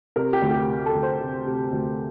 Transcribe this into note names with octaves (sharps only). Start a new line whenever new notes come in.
C3 A#4
G4
D2
G4
C3
A4
D2
C5
C3
C3
D2